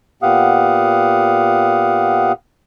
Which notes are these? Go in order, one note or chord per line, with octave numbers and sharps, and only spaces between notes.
A#2 B3 G4 F5 F#5 D#6